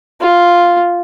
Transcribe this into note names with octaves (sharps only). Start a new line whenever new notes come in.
F4